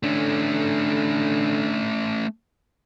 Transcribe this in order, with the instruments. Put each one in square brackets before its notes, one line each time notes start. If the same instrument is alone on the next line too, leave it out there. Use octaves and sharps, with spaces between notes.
[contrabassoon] D3 [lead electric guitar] A3 C#4